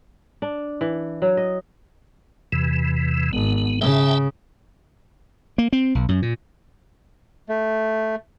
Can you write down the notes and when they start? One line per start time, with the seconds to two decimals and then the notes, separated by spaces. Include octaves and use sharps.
0.42 D4
0.81 E3
1.22 F#3
1.37 D#5
2.52 E2 C3 E3
3.33 G#1 B3
3.81 C#3 E5 G5 A5
5.58 A#3
5.73 C4
5.95 B1
6.09 F#2
6.22 A#2
7.49 A3